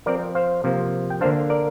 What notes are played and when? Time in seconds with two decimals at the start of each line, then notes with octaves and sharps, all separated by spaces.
0.06 F3 C4 A#4 D5
0.35 C5 F5
0.64 C3 F3 A#3
1.10 G5
1.21 D3 A#3 D4 C5 F5
1.50 A#4 D5